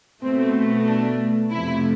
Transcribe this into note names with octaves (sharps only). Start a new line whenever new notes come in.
B2 A3 C4
D4
F2 C3 F3 A3 E4